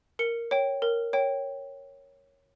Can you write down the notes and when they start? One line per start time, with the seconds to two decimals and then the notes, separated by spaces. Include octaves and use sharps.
0.19 A#4 C#7
0.51 C#5 G5
0.82 A#4
1.13 C#5 G5